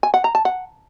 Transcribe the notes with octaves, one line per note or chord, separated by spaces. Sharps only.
G#5
F#5
A#5
A5
F#5